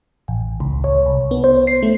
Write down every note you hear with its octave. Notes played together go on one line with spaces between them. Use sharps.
A1
C#2
C#5
C2
B3
C5
C7
A3